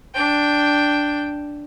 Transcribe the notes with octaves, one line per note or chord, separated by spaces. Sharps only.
D4 G5